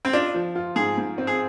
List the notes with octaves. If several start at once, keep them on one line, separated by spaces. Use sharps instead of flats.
C4
D4 F4
F3
F4
G#2 G#4
G#2
C4
G#4